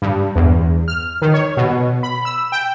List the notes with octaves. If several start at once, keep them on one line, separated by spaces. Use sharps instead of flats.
G2
E2
F6
D#3
C#5
B2
B5
E6
G5